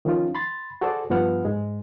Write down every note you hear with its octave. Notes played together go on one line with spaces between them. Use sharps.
D#3 F3 C#4 D#4 F4
B5 C6 A6
F#4 G#4 A4 C5 D5
G2 F3 B3 F#5 F6
G#2 G#3